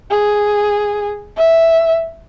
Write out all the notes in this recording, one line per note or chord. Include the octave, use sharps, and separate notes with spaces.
G#4
E5